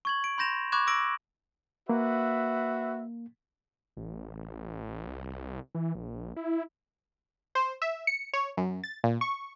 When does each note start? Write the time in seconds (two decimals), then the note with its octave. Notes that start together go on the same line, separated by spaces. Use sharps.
0.05 C#6 G#6 F#7
0.24 D7
0.38 B5 C6 G6 A#6 E7 F7
0.72 B5 C#6 D6 F#6 G#6 E7
0.87 D6 E6 A#6 D7 F#7
1.89 A#3 F#4 B4 E5
3.97 A1
5.07 C2
5.75 E3
5.95 A#1
6.36 E4
7.55 C5
7.82 E5
8.07 C#7
8.33 C#5
8.57 F#2
8.84 A6
9.04 A#2
9.21 C#6